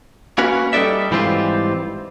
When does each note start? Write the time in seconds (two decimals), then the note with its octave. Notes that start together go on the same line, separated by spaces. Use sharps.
0.38 A#3 C#4 F#4 B4
0.73 G3 D#4 A4 D5 E5
1.11 G#2 E3 G3 C4 F4